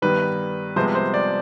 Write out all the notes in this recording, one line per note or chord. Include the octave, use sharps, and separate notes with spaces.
G2 D#3 G3 B3 B4
C2 C3 F3 G#3 B3 C5
C5
D5